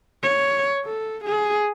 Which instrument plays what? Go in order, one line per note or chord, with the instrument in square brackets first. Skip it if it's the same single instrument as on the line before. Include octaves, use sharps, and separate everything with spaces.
[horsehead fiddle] C#5
A4
G#4